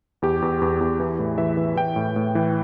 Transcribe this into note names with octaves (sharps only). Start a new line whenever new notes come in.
E2 G4
E2
E2
E2
E3
A2
E3 E5
E3
E3 G5
A2
A2
E3